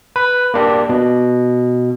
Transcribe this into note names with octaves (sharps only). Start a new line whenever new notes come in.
B4
A#3 D4 G4
B2